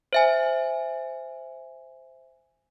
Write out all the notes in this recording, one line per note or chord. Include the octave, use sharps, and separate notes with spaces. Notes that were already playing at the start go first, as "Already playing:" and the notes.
C5 E5 G#5